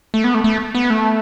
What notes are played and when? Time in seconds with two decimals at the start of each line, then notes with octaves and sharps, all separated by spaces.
0.14 A3
0.24 B3
0.34 A3
0.44 A3
0.75 B3
0.90 A3